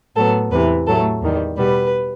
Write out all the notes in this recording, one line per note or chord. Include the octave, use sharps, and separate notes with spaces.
A2 F#3 B3 A4
E2 C3 E3 B4
A2 F#3 A3 A4
E2 D#3 G3
B2 G3 B3 B4